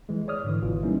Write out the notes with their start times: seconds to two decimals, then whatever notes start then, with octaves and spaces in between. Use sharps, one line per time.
0.09 E3 G#3
0.28 C#5 D5 D#6 F6
0.44 G#2 D3 E3
0.62 G#1 B2 E3 F4
0.82 E3 G3 A#3 C#4 D#4 E4